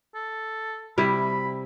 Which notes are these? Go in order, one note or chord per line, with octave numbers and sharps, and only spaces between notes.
A4
C3 G3 E4 B5